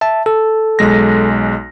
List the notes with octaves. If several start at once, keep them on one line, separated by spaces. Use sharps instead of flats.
E5 A5
A4
B1 G#3 A#6